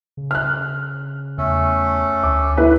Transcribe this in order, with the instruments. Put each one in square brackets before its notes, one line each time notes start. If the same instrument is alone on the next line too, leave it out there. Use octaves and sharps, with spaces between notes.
[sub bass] C#3
[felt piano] F6 F#6
[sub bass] E2 [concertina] A3 C#4 A4
[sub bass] D2 [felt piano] D6
[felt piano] E4 B4